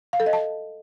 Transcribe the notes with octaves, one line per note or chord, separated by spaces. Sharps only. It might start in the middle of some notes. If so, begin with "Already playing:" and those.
F5
A4
D#5
A5